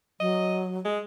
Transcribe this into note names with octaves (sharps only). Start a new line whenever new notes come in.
F#3 D#5
G#3